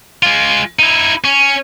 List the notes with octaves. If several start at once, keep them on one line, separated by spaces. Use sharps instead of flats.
G#3 F4
D#4 E4
C#4